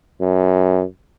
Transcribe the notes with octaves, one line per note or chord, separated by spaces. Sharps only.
F#2